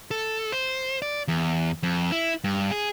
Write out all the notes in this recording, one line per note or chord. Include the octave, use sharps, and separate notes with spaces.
A4
C5
D5
E2
F2
E4
G2
G#4